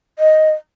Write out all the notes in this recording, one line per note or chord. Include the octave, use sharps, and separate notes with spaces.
D#5